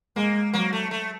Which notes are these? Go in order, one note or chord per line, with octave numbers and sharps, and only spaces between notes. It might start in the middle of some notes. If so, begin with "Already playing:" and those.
G#3 A#3
F#3 A#3
A3
A3